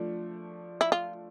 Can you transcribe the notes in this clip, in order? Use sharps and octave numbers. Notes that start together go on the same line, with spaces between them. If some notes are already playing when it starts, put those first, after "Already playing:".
Already playing: F3 A3 D4
E4
F4